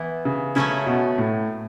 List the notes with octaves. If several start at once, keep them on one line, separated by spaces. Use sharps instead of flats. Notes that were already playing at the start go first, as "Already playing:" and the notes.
Already playing: E3 B3 E4
C#3
C#3 F#3 A3 C#4 E4
B2
A2